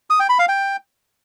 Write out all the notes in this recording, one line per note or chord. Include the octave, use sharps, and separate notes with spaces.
D#6
G5
B5
F5
G5